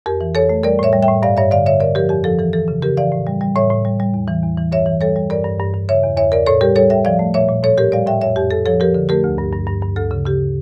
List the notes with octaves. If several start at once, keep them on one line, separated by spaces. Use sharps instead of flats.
F2 G4 A#4
E3
F2 A4 C#5
A3
G3 A#4 D5
A2 C#5 E5
G3
E5 G5
A2
G2 D5 F5
G2 C#5 E5
D3 D5 F5
D3 C#5 E5
D3 A#4 D5
F3 G4 A#4
F2 G4
F3 A4
E3 A4
E3 A4
C#3
C#3 G4 A#4
E3 D5 F5
A2
G3
G3
A2 C#5 E5
A2
G3
G3
E2
E3
E2
E3
G2 C#5 E5
E3
G3 A4 C#5
G3
G2 A#4 D5
G2
G2
G2
C#3 C#5 E5
E2
E2 C#5 E5
E2 A#4 D5
A2 A4 C#5
G3 G4 A#4
G3 A4 C#5
G3 E5 G5
F3 D5 F5
A3
A#2 C#5 E5
A#2
A2 A4 C#5
A2 G4 A#4
G3 D5 F5
A2 E5 G5
F2 C#5 E5
F2 G4
F2 A4
F3 A4 C#5
F3 G4 A#4
D3
A3 G4 A#4
D2
G2
G2
G2
G2
D2 A4
C#3
C#3 G4